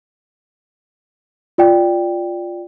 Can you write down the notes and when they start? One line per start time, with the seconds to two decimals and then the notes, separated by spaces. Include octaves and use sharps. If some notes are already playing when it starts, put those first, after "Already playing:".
1.58 F4 D5 G5